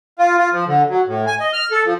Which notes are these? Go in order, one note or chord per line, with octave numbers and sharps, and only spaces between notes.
F4
F4
F3
D3
F#3
A2
G#5
D#5
F6
A4
F3